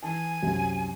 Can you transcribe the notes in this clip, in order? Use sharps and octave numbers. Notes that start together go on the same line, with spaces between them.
E3 G#5 A5
C2 F#2 C3